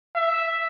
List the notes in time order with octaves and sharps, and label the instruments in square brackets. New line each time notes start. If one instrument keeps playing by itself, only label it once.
[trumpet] E5